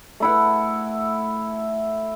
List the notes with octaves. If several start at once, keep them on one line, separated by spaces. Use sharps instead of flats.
A3 E4 F#5